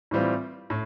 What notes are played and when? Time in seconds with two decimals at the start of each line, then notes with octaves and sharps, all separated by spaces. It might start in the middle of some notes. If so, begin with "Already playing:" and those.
0.11 A2 E3 G3 C4 F4
0.70 A2